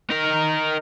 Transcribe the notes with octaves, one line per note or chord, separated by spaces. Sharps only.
D#4 A#4